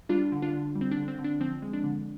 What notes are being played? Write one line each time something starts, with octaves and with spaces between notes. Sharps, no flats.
G3 D4 F4
D3
D4 F4
D3
G3
C4
D4
D3
C4
D3
D4
F3 C4
G#3
D4
D3